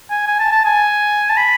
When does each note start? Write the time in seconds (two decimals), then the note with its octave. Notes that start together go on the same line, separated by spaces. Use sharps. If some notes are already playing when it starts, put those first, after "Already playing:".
0.10 G#5
0.27 G#5
0.40 A5
0.52 A5
0.65 G#5
1.29 A5
1.37 B5